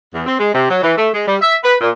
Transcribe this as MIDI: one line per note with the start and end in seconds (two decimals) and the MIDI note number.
0.14 0.22 40
0.27 0.37 60
0.39 0.53 56
0.54 0.67 48
0.69 0.82 54
0.83 0.93 52
0.97 1.09 57
1.14 1.24 56
1.27 1.36 55
1.41 1.55 76
1.64 1.74 71
1.80 1.89 46